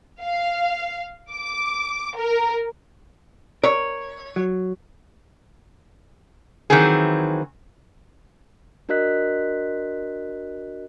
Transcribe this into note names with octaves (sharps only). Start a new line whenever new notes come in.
F5
D6
A#4
A#4 C#5
F#3
D#3 E3 F#3 C4 G#4
D4 F#4 A#4 D#5 F#6 B6